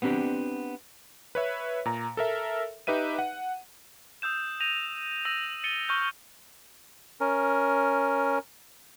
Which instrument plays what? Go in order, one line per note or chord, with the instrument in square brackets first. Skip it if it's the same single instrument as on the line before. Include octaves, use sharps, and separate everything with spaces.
[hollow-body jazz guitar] B3 C4 D4 G4
[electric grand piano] B4 C#5 E5
A#2 A#5
A4 A#4 E5
D#4 G4 B4 E5 D#7
F#5
[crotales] D#6 E6 G6 E7
G6 A#6 D#7 F7
E6 A#6 D#7 F7 F#7
A6 C#7 D#7 G7
C#6 F6 G6
[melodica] C#4 A#4